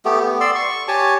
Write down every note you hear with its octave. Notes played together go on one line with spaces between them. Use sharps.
A3 B3 G4
B3
D5 C6 E6
C#6
G4 C#5 G#5 A5